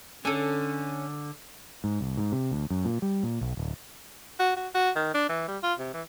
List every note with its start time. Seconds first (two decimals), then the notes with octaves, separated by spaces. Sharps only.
0.25 D3 C#4 A4 G#5
1.84 G#2
2.01 C2
2.17 G#2
2.32 C3
2.51 D2
2.70 F#2
2.85 A#2
3.02 G3
3.23 A#2
3.41 B1
3.57 D1
4.39 F#4
4.56 F#4
4.74 F#4
4.96 D#3
5.14 D4
5.29 E3
5.48 G3
5.63 F4
5.79 C3
5.94 E3